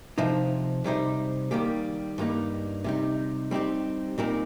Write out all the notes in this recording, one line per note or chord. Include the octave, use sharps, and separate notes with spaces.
C3 F3 D#4 C5
C3 G3 D#4 C5
D#3 G3 A#3 G4
G2 G3 A#3 D#4
C3 G3 D#4
G3 C4 D#4 G4
A#2 G3 C4 D#4 A#4